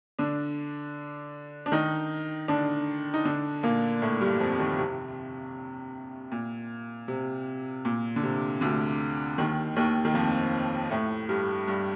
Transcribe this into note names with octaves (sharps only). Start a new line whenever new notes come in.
D3 D4
D4
D#3 D#4
D3 D4
D#4
D3 D4
A#2 A#3
A2 A3
G2 G3
G3
F2 F3
D#2 D#3
C3
A#2
C3
A#2
D3
C3
D2 D3
D#2 D#3
D#2 D#3
D#3
F2 F3
A2 A3
G2 G3
G2 G3